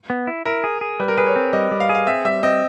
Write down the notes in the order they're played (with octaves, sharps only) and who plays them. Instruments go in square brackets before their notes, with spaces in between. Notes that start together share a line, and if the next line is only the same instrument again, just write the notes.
[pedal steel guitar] B3
E4
[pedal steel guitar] E4 [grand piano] A#4
[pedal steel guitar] G#4
G#4
[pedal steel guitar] G3 [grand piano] B4
[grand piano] A#4
[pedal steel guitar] G#4 [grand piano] B4
[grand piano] C#5
[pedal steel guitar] C4
[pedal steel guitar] G3 [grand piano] D#5
[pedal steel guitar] G3
[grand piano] F5
[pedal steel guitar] G#4
[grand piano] F5
[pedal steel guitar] C4 [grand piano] E5
[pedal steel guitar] G3 [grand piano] E5
[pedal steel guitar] C4 [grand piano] D#5